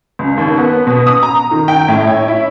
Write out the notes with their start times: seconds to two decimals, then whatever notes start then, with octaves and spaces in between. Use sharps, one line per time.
0.19 C#2
0.37 D#2
0.57 B3
0.87 B2
1.06 D#6
1.23 A#5
1.51 D#3
1.68 G5
1.88 A2
2.07 C#5
2.28 E4